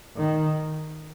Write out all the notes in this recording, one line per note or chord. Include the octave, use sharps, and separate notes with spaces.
D#3